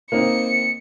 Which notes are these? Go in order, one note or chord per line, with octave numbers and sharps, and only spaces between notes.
A#3 C4 D#4 C#7